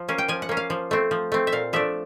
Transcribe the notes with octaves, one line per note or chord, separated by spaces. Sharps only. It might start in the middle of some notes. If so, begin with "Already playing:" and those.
Already playing: F3
A#3 C#4
G5
F3 G#5
F#5
A#3 C#4
F5
F3
A3 C4
F3
A3 C4
E5
A#2 F5
F3 A3 D4 E5